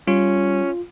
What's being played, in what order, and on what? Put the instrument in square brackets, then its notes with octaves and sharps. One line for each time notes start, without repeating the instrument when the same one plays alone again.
[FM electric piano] G3 [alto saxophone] C#4 [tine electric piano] F4